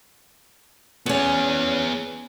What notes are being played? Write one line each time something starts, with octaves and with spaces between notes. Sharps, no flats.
E2 B3 C#4 G#4